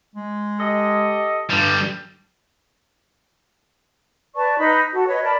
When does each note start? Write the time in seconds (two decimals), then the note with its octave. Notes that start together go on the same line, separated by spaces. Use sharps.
0.15 G#3
0.59 G4 A4 D#5
1.50 G2 D3 G3
4.35 B4 D5 A5 C#6
4.58 D#4 B4 B5
4.92 F#4 A4
5.07 B4 C#5 D#5
5.23 A#4 D5 A5 B5